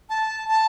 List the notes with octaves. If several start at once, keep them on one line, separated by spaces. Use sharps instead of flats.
A5
A5